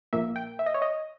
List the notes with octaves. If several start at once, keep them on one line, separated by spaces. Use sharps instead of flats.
A#1 A#2 A#3 E5
G5
E5
D#5
C#5
D#5